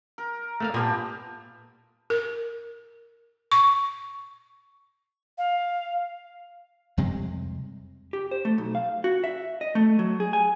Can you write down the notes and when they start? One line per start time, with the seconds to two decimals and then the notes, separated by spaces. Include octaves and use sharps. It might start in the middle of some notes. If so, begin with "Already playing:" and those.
0.18 A#4
0.60 A3 A#3 F5
0.74 A#2 A#3 B3 G4 G#5 A5
2.10 A#4
3.52 C#6
5.38 F5
6.97 F2 C3 G3 G#3
8.13 G4
8.31 C5
8.45 A3
8.58 B1
8.75 F5
9.04 F#4
9.24 E5
9.61 D#5
9.75 A3
9.99 F#3
10.20 G#4
10.33 G#5